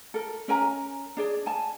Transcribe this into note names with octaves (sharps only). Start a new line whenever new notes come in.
A4 A#4
C#4 A#4 G#5 A#5
D4 G#4 D5
G#5 A5